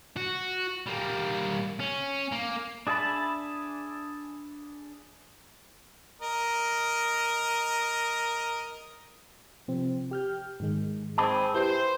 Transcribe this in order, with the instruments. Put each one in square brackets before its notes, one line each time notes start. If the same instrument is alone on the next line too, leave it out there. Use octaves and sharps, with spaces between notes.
[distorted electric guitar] F#4
G3 A#3
C#4
A#3
[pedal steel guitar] D4 G#4 E5 A5 B5
[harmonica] A#4 D#5
[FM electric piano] C3 F3 C4
G4 F6 G6
G#2 D#3 G#3
[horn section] C4 G#4 [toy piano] A5 B5 D6
[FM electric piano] E4 G4 B4 [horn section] C5